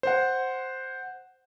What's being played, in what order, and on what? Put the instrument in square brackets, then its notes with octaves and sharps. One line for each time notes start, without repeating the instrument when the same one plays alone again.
[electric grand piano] C5 F#5